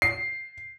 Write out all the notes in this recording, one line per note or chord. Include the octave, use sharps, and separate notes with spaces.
C7